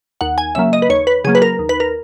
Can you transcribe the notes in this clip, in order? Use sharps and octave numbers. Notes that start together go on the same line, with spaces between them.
D#2 F#5
G#5
C#3 F#3 A#3 E5
D#5
B4
D#2 C#5
B4
C#3 F#3 A#3 G#4
B4
A#4
D#2
B4
A#4